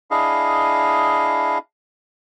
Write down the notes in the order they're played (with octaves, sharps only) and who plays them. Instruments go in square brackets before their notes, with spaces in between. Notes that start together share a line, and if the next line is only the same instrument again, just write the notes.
[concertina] D4 E4 G#4 D#5 F5